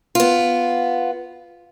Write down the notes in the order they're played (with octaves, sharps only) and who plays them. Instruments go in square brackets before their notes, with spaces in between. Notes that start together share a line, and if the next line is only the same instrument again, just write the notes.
[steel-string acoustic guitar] B3 F4